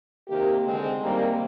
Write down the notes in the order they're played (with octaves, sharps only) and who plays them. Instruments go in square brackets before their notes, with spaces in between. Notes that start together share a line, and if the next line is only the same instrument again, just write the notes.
[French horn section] C3 D#3 A#3 G4
D3 G#3 C4
C3 D#3 G3 A#3